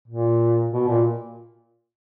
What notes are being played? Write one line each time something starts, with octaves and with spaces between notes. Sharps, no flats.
A#2
B2
A#2